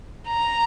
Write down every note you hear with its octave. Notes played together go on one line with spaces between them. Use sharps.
A#5